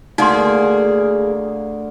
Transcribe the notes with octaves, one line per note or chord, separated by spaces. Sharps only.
D2 A#3 D#4 G#4 C6